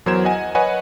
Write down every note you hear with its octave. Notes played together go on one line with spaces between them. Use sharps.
E2 F#3 A#4 C5 G#6 E7
D#5 F#5 G#5
B4 C#5 D#5 F#5 G#5